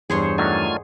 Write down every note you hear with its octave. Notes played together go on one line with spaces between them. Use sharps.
E2 G2 G#4 C5 C#5
D3 D#3 F#3 A3 F4 G#5